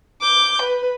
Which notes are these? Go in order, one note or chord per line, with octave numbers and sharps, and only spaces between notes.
D6 G6
B4